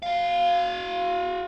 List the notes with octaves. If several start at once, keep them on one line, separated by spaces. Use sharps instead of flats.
F#4 F5